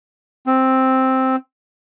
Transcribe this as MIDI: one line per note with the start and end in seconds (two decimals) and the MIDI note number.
0.47 1.36 60